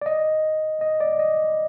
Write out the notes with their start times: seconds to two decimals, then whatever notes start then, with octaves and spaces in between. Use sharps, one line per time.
0.02 D5
0.06 D#5
0.81 D#5
1.00 D5
1.19 D#5